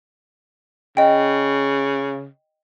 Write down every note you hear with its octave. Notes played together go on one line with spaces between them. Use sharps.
C#3 D#5 G5